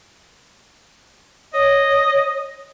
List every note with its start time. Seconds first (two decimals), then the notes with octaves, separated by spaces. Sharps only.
1.54 C#5 D#5